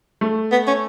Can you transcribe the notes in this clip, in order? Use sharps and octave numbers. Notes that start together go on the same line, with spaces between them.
A3
B3
C#4